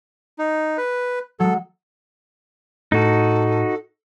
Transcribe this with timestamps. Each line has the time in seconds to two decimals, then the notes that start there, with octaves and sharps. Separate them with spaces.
0.39 D#4
0.78 B4
1.40 F#3 G#3 A4
2.92 A2 D#4 F#4 A4